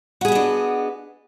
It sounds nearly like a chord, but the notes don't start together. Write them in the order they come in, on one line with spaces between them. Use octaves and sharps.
F#4 G#4 B3 D#5 D4